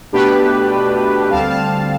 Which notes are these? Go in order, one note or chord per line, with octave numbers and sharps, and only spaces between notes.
B2 A3 D4 G4 B4
D2 D3 G3 C4 F5 A5
F5 A5